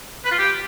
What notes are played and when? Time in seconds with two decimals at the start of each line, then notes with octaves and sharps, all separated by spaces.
0.25 B4
0.32 F4
0.38 G4